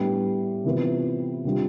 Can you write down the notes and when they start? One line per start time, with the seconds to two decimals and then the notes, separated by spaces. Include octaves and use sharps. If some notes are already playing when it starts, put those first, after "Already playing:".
Already playing: A2 G3 B3 D4
0.65 C3 E3 B3 F4
1.45 C3 G3 D4 F4